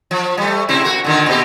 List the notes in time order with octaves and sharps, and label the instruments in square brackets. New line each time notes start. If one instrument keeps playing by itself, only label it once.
[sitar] F3
G3 A3
C3 C4 E4
A#3 F#4
A#2 D3 D#3
A#2 C4 G4